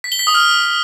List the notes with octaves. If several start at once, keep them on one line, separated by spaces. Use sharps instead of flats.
B6
G7
B6
D#6
F6